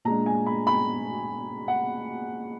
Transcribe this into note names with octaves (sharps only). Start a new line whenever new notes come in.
A#2 G#3 D4 A#5
G#5
B5
B5
F#5